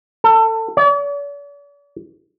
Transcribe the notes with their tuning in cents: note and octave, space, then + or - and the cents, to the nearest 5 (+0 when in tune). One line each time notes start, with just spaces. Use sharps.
A4 +25
D5 -45